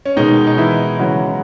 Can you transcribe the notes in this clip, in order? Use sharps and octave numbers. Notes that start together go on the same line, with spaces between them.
C#4
B2 D#3 G#3 D#4
D#4
E3 E4
C#3 E3 F#3 G#3 F#4